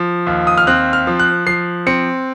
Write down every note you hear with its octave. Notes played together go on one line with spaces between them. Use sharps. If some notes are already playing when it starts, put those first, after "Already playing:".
Already playing: F3
D#2
D#6
F6
C4 F#6
F6
F3
F#6
F3 C7
C4 C#7